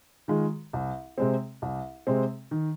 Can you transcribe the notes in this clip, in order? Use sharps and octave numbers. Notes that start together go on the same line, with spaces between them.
D#3 G#3 F4
C2
C3 G#3 C4
C2
C3 G#3 C4
D#3